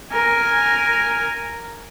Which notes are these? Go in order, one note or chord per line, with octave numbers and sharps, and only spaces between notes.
A#4 G#5